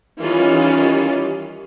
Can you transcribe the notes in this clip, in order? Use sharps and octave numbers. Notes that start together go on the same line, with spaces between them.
D#3 E3 G3 C#4 D#4 F4